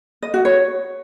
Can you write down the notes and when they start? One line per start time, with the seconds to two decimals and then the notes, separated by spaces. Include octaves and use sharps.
0.22 D#5
0.34 F#4
0.45 C#5